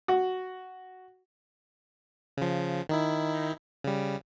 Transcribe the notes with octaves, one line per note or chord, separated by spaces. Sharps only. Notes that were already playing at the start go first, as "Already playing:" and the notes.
F#4
C#3 F3
D#3 D#4 E4
C#3 G3